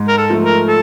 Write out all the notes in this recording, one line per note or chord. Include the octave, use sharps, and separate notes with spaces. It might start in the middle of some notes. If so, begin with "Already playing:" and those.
Already playing: G#2
A#4
A4
F3 A3
A#4
A4